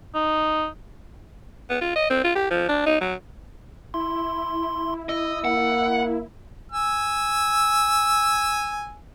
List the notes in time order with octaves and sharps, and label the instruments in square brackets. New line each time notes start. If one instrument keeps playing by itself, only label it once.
[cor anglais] D#4
[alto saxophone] B3
F4
D#5
C4
F4
G4
F3
D4
D#4
F#3
[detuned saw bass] E4 [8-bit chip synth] C6
[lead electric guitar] D#5 [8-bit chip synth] E6
[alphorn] A#3 [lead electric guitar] F#5
[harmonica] G#5 E6